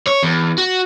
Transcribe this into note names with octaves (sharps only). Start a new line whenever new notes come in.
C#5
E2
F#4